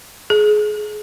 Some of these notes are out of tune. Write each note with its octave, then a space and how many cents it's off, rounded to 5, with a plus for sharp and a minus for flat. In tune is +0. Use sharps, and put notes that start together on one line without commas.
G#4 +25